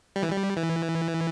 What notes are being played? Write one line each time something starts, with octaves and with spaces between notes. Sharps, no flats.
G3
E3
G3
E3